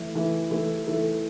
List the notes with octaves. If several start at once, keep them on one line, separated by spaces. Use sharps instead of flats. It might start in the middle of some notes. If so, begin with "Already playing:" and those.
Already playing: E3 A3 E4 A4
E3 A3 E4 A4
E3 A3 E4 A4
E3 A3 E4 A4